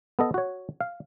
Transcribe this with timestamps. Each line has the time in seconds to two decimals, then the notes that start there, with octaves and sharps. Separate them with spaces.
0.19 B3 A4 D#5
0.34 F#4 C#5
0.81 F5